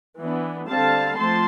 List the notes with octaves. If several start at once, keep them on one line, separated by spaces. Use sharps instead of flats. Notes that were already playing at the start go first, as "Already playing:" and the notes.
E3 B3 D4
D3 G3 C4 F5 A5
F3 A3 C4 A5 C6